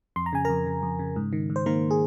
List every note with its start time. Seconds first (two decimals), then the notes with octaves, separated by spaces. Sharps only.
0.16 F2 C6
0.26 A#5
0.33 C#3 G#5
0.45 F2 A#4 A#5
0.66 C#3
0.83 F2
0.99 C#3
1.16 G#2
1.33 D#3
1.50 G#2
1.56 C5
1.66 D#3 A#3 A#4
1.91 G#4